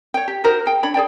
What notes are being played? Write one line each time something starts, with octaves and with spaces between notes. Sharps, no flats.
C#5 G5
G4
D#4 F#4 A#4 C5
G#4 G5
D4 C#5 B5
G#4 C5 D5 G5